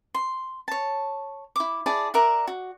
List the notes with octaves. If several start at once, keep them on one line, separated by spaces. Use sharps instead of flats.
C6
C#5 A5
E4 D6
E4 G#4 D5 A5
A#4 D5 E5 F#5
F#4